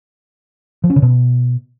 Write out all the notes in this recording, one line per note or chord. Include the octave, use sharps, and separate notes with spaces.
F3
C#4
C#3
B2